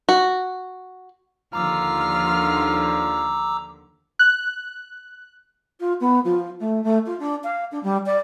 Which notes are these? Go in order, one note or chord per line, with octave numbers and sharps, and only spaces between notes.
F#4
D#2 D3 F3 F4 A#5 D6 E6 F6
F#6
F4
B3
F3
A3
A3
F4
D4
F5
D4
G3
D5